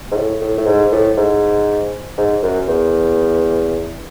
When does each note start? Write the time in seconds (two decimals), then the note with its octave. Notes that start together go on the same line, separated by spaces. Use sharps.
0.12 G#2
0.16 A2
0.41 A2
0.58 A2
0.66 G#2
0.92 A2
1.17 G#2
2.18 G#2
2.43 F#2
2.68 E2